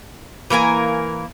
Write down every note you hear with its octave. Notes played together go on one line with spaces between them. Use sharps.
E3 A#3 A#4 G#5